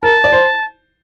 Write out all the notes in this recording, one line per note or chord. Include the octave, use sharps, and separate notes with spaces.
A#4 A5
D5
C5